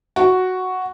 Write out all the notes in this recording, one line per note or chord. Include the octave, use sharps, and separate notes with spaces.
F#4